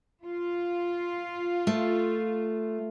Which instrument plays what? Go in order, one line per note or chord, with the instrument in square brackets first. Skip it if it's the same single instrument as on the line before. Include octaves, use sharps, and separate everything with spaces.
[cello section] F4
[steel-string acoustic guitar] A3